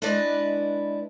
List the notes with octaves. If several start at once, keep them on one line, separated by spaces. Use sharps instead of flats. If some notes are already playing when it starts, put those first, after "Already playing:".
G#3 D4 E4 B4 D5 D#5